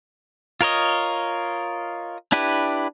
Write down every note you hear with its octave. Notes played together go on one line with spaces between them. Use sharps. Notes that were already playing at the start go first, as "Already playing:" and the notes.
F4 A#4 C#5 D#5
D4 E4 G4 B4